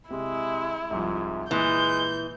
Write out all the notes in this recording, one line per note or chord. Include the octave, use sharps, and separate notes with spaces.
C3 G#3 E4
C2 G#2 F3
A#2 E3 G#3 G6